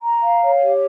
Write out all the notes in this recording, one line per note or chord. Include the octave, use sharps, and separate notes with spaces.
A#5
F5
C#5
G4